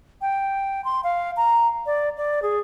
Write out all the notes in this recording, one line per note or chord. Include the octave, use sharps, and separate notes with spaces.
G5
C6
F5
A#5
D5
D5
G#4